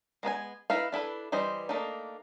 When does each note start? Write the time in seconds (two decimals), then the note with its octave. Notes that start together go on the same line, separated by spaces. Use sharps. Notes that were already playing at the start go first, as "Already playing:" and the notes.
0.23 G#3 B3 B4 G#5
0.70 D#4 E4 B4 F5
0.92 D4 E4 A4 B4
1.32 E3 G3 C5 D#5
1.69 A3 A#3 D4 D#4